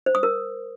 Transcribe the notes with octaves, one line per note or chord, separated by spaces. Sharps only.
C5
D#6
A#4